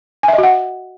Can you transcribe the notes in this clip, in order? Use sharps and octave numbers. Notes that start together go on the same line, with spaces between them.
G#5
E5
D#5
F#4
F#5